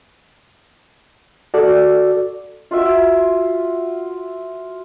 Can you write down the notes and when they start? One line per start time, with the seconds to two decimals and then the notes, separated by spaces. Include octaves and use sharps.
1.54 F#4 A4 D5
2.71 F4 F#4 E5